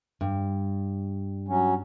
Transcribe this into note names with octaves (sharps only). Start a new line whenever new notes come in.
G2
F#3 C#4